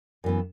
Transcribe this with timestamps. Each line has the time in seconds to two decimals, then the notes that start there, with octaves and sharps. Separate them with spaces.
0.24 F#2 E3 B3